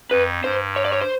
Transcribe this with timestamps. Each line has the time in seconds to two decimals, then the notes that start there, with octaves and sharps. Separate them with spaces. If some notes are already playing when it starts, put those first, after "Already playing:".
0.11 F2 B4
0.44 G2 C5
0.76 C#5
0.85 D5
0.92 C#5
1.01 C5